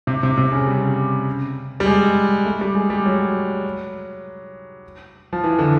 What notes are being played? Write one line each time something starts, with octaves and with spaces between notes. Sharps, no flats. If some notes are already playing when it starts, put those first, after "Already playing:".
C3
C3
C3
C#3
G3
G3
G#3
A3
G3
G#3
G3
F#3
F3
E3
D3